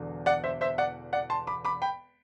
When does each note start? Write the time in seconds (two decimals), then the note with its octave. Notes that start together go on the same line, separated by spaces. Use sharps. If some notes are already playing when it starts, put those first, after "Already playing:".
Already playing: E1 E2 D3
0.26 D5 F#5
0.44 C5 E5
0.61 C5 E5
0.78 D5 F#5
1.13 D5 F#5
1.30 A5 C6
1.47 B5 D6
1.65 B5 D6
1.82 G5 B5